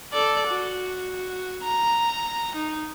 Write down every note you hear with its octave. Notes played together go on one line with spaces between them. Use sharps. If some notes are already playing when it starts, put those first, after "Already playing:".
A4 D5
F#4
A#5
D#4